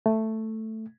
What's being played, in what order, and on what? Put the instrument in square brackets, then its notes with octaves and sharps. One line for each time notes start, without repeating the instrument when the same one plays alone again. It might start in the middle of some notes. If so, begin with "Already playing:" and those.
[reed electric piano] A3